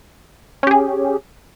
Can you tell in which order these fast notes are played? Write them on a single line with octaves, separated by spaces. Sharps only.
C#4 G4 G#4